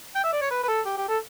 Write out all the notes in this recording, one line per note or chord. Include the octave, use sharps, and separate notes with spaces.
G5
E5
D5
C#5
B4
B4
A4
G4
G4
A4